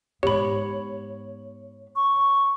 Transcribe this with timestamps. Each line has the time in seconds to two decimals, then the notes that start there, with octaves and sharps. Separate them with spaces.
0.23 G#2 B3 G4 C#5 B5
1.96 C#6